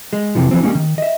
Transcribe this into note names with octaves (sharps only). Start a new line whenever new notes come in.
G#3
F2 C3 E3 F3
E3 F3 C4
G3 G#3 A#3 C#4
D#3
D#5 E5